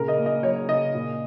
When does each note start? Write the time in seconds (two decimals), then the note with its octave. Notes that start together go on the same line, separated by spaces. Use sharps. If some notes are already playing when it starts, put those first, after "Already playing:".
Already playing: A#2 C#3 A#4
0.08 D#5
0.17 A#3
0.26 D#5
0.42 F#3 C#5
0.68 C#3 D#5
0.94 A#2